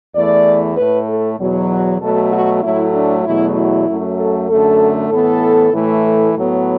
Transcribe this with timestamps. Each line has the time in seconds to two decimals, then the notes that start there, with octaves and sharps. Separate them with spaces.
0.15 E2 E3 A3 D5
0.77 A2 A3 B4
1.08 A4
1.39 E2 B2 F#3
1.71 F#4
2.01 B2 F#3 A3 A4
2.32 F#4
2.63 A2 F#3 A3 E4
2.94 D4
3.24 E2 B2 F#3 A3 E4
3.55 E4
3.87 F#2 F#3 A3
4.17 A4
4.48 F#2 D3 A3 A4
5.10 A2 E3 B3 A4
5.73 A2 E3 A3
6.03 A4
6.33 A2 F#3 B3